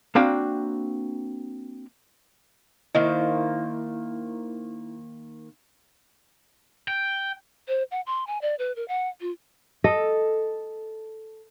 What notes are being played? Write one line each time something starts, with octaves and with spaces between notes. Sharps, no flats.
A#3 C4 D4 F#4 F5 G5
D#3 A#3 E4 C5 D#5
G5
C5
F#5
C6
G#5
D5
B4
A#4
F#5
F4
A4 D#5